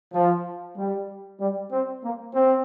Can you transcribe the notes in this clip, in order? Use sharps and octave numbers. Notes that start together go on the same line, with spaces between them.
F3
G3
G3
C4
A#3
C4